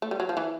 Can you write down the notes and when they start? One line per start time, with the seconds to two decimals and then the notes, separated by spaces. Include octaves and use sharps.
0.02 A3
0.11 G3
0.20 F#3
0.29 F3
0.37 E3